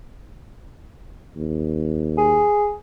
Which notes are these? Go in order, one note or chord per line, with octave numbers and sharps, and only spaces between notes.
D#2
G#4